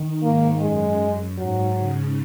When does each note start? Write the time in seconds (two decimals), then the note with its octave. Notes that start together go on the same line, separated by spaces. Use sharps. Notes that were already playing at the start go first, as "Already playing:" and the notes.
Already playing: D#3
0.23 G#2 A#3
0.61 F#2 G#3
1.38 G#2 F#3
1.78 C#3